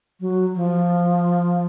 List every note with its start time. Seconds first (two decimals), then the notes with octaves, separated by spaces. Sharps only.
0.20 F#3
0.55 F3